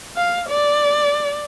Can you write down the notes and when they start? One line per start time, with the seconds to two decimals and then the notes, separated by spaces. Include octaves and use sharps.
0.17 F5
0.49 D5